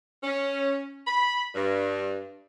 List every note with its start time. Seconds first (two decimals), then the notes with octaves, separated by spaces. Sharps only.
0.23 C#4
1.07 B5
1.55 G2